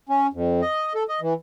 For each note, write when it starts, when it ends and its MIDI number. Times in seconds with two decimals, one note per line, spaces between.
0.09 0.27 61
0.33 0.62 41
0.62 0.93 75
0.95 1.03 69
1.08 1.20 75
1.21 1.33 52